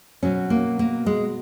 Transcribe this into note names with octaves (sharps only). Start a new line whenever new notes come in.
B2 F#3 C#4
A#3
A#3
G#3